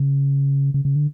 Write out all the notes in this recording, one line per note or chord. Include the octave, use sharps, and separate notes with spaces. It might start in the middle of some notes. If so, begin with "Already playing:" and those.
Already playing: C#3
C#3
C#3
D3